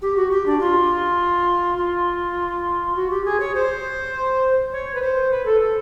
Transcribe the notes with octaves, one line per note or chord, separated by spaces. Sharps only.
G4
F#4
G4
D4
F4
F4
F#4
G4
G#4
C#5
C5
C#5
B4
C5
B4
A4
A4